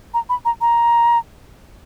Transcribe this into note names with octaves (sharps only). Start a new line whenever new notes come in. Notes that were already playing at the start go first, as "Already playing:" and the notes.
A#5
B5
A#5
A#5